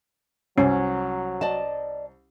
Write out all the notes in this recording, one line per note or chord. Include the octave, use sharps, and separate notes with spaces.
C2 F#3 C#4
D5 D#5 A5